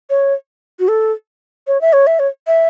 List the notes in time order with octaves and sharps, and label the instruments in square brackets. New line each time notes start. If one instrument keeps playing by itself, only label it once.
[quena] C#5
F#4
A4
C#5
E5
C#5
E5
C#5
E5